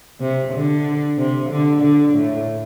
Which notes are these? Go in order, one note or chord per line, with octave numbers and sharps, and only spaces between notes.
C3
D3
C3
D3
D3
A2